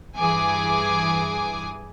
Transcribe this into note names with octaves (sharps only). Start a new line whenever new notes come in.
G2 E3 G#4 G#5 D6